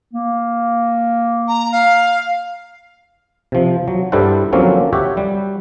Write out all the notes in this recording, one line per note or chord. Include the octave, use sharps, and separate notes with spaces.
A#3
A#5
F5
C3 F3
F#3
G2 G3 E4 A4 C5 F#5
D3 F3 F#3 A#3 C4 C#4
F#4 G4 C#5 E5 F#5
G3